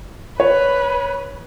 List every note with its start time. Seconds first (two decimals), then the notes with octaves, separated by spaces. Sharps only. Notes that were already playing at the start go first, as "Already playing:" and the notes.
0.40 B4 C#5